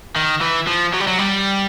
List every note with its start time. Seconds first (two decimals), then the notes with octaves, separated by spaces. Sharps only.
0.16 D#3
0.41 E3
0.67 F3
0.94 F#3
1.00 G3
1.07 F#3
1.18 G3